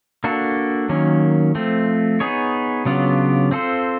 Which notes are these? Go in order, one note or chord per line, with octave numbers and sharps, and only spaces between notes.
A#3 D4 F#4 A4
D#3 F#3 A#3 C#4
F3 A3 C4
B3 D#4 G#4 C#5
C#3 F#3 B3 D4 F4
C4 F4 A4 C5